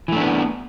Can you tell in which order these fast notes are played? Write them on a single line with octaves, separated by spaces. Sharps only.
E3 A3 D4 B3